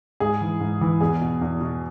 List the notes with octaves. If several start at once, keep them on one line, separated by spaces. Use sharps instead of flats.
G#2 G#4
E3
G#2
E3
E2 G#4
B2
E2
B2